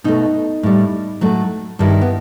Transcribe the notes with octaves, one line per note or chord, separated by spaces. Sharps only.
B2 A3 D#4
A2 G3
A2 F#3 A3
G2 D#3 G3 E4
B3